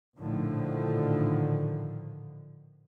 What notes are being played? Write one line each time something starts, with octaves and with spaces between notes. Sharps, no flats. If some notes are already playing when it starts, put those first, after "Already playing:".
A#1 A2 D3 D#3 F3